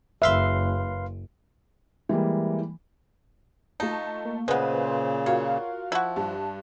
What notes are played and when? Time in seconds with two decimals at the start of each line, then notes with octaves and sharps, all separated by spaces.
0.22 F#1 B4 E5 F5 C6
2.09 E3 G3 G#3 A#3
3.80 A3 D#4 F4 A5
4.25 A#3
4.48 A#2 C#3 G#3 B3 B4 C5
5.26 F4 F#4 A#4 C#5 F5
5.92 F3 E4 F#4
6.16 G2 A5